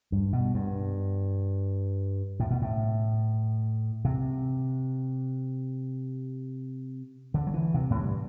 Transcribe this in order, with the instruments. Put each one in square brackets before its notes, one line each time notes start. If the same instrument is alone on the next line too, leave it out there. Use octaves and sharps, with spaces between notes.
[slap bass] G2
B2
G2
A2
B2
A2
C3
D3
F#3
E3
C3
A2
G2